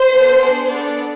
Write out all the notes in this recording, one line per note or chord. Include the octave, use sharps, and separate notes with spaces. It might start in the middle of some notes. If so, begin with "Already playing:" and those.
Already playing: C5
B3 D4 A4
D4 G#4 C5
B3 D4 A4 D5